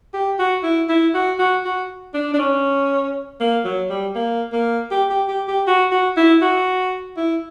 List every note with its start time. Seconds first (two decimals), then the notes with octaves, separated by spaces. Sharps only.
0.14 G4
0.39 F#4
0.64 E4
0.89 E4
1.14 F#4
1.39 F#4
1.65 F#4
2.14 D4
2.34 D4
2.39 C#4
3.40 A#3
3.65 F#3
3.90 G3
4.16 A#3
4.53 A#3
4.91 G4
5.10 G4
5.28 G4
5.48 G4
5.67 F#4
5.91 F#4
6.17 E4
6.42 F#4
7.17 E4